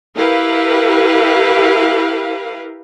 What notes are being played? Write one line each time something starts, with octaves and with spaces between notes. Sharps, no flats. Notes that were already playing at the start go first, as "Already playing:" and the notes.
E4 G4 A#4 B4 F5